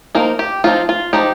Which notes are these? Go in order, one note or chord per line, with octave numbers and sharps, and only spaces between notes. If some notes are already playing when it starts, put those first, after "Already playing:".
F3 A#3 D#4 A#4
G4
F3 C4 D#4 F4
F4
F3 D#4 G4